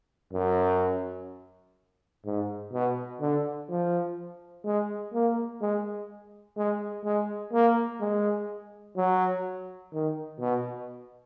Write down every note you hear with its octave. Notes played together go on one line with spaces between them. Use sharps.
F#2
G#2
B2
D3
F3
G#3
A#3
G#3
G#3
G#3
A#3
G#3
F#3
D#3
B2